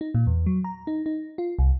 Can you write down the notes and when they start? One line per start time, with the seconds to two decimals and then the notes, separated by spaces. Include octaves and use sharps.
0.01 D#4
0.14 A#2
0.27 E2
0.46 F#3
0.64 A#5
0.87 D#4
1.06 D#4
1.38 F4
1.59 C2